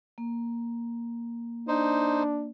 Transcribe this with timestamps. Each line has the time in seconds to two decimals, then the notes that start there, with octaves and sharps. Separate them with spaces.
0.18 A#3
1.68 D4 D#4 C5